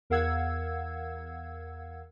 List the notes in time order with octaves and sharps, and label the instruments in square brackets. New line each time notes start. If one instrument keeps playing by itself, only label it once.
[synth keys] E2 A#4 F5 F#5 E6 G#6